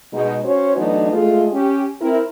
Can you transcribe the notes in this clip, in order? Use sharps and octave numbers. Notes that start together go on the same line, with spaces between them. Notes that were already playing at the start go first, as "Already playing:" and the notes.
B2 G#3 D#4
C#4 F#4 C5 C#5
E3 F#3 A3 B3 D4 D#4
G#3 A3 F4
C#4 G4
C4 E4 A#4